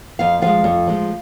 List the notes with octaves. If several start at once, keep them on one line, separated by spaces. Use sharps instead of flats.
F2 F5
F3 G#3 F5
F2
F3 G#3